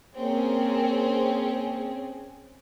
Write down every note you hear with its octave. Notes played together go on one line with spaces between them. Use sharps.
A#3 C4 C#4 G#4